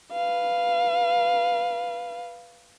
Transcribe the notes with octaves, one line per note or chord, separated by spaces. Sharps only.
B4 F5